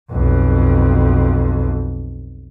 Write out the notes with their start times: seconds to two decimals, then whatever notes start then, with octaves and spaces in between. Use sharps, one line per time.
0.11 B1 F2